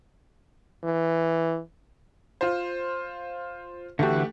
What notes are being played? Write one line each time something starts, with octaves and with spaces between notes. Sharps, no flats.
E3
F4 C5
D3 E3 A3 F#4 G4